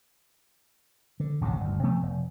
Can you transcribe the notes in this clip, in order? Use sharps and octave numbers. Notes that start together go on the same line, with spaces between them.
D3
A1 D2 G#2 C3
G1 D2
C3 F3 A3 B3
F1